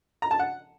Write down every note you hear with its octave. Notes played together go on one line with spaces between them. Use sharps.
A#5
A5
F#5